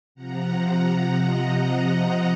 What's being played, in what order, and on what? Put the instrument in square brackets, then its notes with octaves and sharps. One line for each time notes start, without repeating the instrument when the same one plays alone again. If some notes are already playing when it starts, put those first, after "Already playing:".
[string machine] C3 F3 F#5 A#5
F#5 A#5
D#5 F#5
D#5 F#5